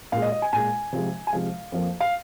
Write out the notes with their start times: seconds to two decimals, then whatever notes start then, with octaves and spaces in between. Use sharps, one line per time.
0.12 A#2 G#3 F5
0.22 D#5
0.32 D#5
0.42 G#5
0.53 A#2 G#3 G#5
0.92 C3 F3 G#3
1.27 G#5
1.33 C3 F3 G#3 F5
1.72 F2 F3 A#3
2.00 F5